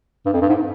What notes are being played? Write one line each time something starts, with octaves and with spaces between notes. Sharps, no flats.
G2
F2
G2
G#2